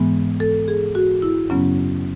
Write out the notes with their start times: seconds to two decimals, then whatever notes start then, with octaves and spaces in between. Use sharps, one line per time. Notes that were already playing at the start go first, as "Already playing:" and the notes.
Already playing: G#2 E3 G#3 B3
0.40 A4
0.68 G#4
0.95 F#4
1.22 E4
1.50 F#2 C#3 F#3 B3 C#4